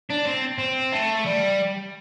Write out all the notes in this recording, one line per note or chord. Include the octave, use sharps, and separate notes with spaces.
D4
C4
C4
A3
G3